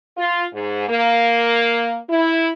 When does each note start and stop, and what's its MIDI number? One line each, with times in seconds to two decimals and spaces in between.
0.18 0.45 65
0.54 0.86 44
0.88 1.99 58
2.09 2.50 64